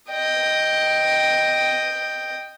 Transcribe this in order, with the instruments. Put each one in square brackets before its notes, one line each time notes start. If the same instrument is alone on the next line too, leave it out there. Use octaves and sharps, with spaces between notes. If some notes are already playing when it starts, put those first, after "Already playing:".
[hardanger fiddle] D#5 G5